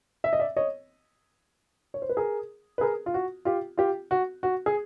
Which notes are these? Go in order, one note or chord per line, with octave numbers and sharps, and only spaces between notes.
E5
D#5
D5 E5
C#5 D#5
C#5
C5
B4
G#4 A#4
B4
G#4 A#4
F4
F#4
F4 G4
F4 G4
F#4
F#4
G#4